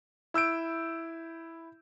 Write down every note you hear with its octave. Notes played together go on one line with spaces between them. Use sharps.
E4 E6 G6 D7